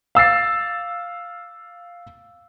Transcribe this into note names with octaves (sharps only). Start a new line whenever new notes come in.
F5 E6 A6 C7